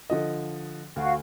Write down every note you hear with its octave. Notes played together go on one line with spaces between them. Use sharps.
D3 F3 D#5
D2 F#4 F5